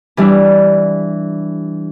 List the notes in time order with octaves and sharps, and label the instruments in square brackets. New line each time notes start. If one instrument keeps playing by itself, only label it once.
[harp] E3 G3 D4 E4